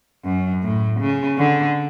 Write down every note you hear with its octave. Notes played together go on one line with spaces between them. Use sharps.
F#2
A2
C#3
D3